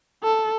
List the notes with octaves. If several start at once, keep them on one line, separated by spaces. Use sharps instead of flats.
A4